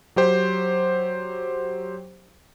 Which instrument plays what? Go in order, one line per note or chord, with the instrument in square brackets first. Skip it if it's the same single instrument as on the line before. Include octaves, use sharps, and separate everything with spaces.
[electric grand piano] F#3 G4 C5